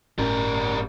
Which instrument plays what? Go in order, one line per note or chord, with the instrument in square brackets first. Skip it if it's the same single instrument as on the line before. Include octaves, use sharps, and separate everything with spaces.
[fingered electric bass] G1 A2 C#4 [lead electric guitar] G3 A#4